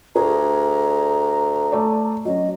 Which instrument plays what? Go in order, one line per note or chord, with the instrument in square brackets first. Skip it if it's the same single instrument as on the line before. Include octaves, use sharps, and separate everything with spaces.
[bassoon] D2 [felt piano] G#4 [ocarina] A#5
[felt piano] A3 D5
[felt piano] F#3 C#4 [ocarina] D#5